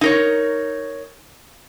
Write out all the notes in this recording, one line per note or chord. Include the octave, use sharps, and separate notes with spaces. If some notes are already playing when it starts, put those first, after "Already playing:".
D#4 A#4 C#5